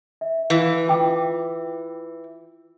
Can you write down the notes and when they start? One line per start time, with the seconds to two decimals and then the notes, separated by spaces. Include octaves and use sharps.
0.21 E5
0.50 E3 F5
0.88 F4 G5 D6